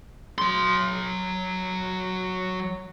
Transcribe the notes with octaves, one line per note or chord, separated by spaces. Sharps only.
F#3 C6